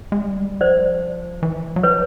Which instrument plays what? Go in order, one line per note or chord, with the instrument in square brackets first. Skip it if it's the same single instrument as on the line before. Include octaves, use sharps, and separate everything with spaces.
[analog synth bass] G#3
G3
[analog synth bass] F3 [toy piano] C5 D5
[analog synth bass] E3
F#3
[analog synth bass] F3 [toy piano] B4 C#5